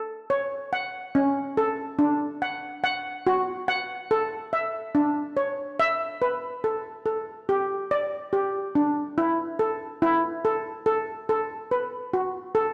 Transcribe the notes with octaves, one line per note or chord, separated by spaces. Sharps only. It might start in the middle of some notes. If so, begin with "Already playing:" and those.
Already playing: A4
C#5
F#5
C#4
A4
D4
F#5
F#5
F#4
F#5
A4
E5
D4
C#5
E5
B4
A4
A4
G4
D5
G4
D4
E4
A4
E4
A4
A4
A4
B4
F#4
A4